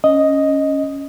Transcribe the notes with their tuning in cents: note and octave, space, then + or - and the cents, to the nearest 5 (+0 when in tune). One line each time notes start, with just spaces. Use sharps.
C#4 +5 D#5 +0